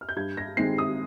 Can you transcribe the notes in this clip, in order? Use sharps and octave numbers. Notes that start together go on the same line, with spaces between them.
F6
G6
G2 G#6
A#6
D#3 G#3 C4 C7
D#6